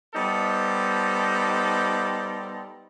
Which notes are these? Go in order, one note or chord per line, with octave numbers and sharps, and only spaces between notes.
G3 B3 D#4 A4 C5